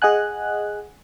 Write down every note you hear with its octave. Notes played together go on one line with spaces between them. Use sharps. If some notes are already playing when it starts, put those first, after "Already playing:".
G#4 D#5 F#5 G#5 F#6